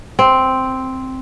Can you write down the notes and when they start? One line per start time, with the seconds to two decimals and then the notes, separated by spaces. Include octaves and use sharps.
0.19 C4